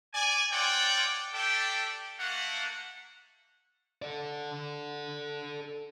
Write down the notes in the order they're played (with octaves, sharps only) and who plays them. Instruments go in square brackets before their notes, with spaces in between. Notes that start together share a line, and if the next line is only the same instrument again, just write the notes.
[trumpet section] D5 G#5
F4 A4 C#5 D5 F#5 G5
A3 D4 G4 A4 D5 G5
A3 A#3 F#5
[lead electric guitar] A4 D5